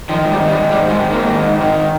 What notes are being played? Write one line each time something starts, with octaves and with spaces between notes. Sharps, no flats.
D#3 F3
G#2
G3
D#3
G3
G#2
D#3 G3
G#2 G#3
D#3
G#2 A#3
D#3
G#2
D#3